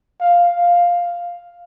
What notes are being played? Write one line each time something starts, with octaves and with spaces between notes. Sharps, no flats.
F5
F5